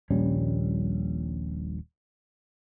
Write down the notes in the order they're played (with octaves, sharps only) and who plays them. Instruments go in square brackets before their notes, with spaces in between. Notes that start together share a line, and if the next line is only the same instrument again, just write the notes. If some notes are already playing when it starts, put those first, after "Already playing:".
[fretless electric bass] D#1 A#1 G3 C#4